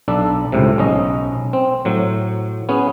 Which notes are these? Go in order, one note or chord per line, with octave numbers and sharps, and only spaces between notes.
B1 D4 A4
C#2 A2 C3
B1 C#4 D#5
C4
A2 F#3
B3 C#4 G#4